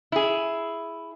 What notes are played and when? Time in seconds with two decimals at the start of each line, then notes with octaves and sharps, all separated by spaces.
0.12 E4 G#4